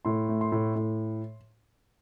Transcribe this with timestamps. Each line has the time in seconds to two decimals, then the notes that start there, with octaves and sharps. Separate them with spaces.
0.05 A2 C6
0.29 A3
0.41 C6
0.52 A2
0.76 A2